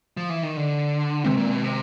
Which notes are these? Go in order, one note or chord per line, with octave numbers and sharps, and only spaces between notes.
F3
E3
D#3
D3
C3 D#3 G#3 C4
A#2
B2
C3